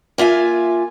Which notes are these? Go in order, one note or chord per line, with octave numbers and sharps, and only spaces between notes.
A#3 F4 E5 G#5